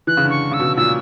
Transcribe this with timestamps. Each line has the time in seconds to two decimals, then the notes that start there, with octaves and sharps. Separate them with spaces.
0.07 E3 F#6
0.17 C#3
0.25 D3
0.30 C#6
0.51 C#3 E6
0.59 B2
0.77 A#2 E6